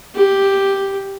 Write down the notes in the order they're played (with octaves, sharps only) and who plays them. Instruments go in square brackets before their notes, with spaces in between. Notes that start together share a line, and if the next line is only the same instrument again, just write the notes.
[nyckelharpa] G4